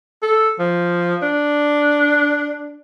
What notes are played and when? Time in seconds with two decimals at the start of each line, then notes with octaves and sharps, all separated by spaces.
0.22 A4
0.59 F3
1.23 D4